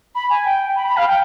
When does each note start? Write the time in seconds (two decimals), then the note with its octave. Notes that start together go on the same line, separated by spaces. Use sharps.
0.15 B5
0.29 G#5
0.44 G5
0.75 B5
0.86 B5
0.96 F5
1.07 G5